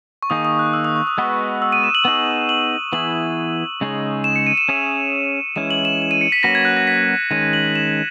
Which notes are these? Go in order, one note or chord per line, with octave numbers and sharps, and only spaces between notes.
C#6
D#3 A#3 D#4 G#4 D#6
D#6
F#6
E6
D#6
C#6
D#6
G#3 B3 F#4 B4 D#5
E6
D#7
E7
F#7
B3 D#4 G#4
F#7
E3 B3 E4 G#4 F#7
C#3 G#3 D#4 G#4 C#5
E7
C#7
D#7
E7
C#4 G#4 C#5 E5
E3 G#3 C#4 E4 E7
F#7
E7
E7
D#7
C#7
B6
F#3 A#3 C#4 F#4 B4 A#6
G#6
F#6
A#6
B6
D#3 G#3 C#4 D#7
F#7
E7